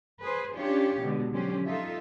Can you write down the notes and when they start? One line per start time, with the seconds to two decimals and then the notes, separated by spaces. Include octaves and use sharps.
0.22 G#4 B4 C5
0.56 C#4 D4 F4 G4 C#5
1.00 B2 D3 G#3
1.33 D3 F3 F#3 C#4 G4 C5
1.65 D#4 F4 A4 E5